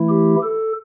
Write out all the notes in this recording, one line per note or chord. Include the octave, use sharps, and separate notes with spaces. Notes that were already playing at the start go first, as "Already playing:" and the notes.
Already playing: E3 A3 E4
G4
A4